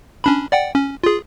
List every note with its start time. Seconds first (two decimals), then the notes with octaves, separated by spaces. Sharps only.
0.24 C#4 D4 B5
0.52 D5 F#5 G5
0.75 C#4
1.04 F4 G#4